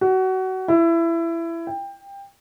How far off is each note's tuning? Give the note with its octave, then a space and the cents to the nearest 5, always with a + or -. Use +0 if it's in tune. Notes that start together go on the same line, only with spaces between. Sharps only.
F#4 +25
E4 +20
G5 +20